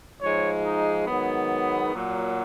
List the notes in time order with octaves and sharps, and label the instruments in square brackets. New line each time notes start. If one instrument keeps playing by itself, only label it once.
[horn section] G#2 F3 G#3 C#5
D#4
G#2 D#3 F#3 B3
A#2 F#3